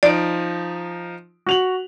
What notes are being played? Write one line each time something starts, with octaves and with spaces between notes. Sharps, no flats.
F3 D#4 D5 D7
F#4 F7 F#7